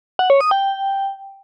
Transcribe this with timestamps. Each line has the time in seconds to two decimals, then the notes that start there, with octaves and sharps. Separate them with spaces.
0.19 F#5
0.30 C#5
0.41 D#6
0.51 G5